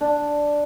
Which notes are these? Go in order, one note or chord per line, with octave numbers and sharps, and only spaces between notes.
D4